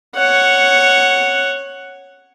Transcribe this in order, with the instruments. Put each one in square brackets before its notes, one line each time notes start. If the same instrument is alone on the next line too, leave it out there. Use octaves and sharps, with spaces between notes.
[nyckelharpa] C#5 F#5